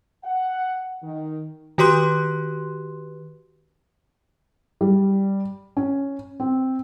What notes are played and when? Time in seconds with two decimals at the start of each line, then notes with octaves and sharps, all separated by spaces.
0.24 F#5
1.03 D#3
1.78 D#3 F#4 G4 B4 C6 F#6
4.81 G3
5.77 C#4
6.40 C4